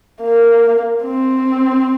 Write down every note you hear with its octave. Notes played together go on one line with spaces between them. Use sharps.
A#3
C4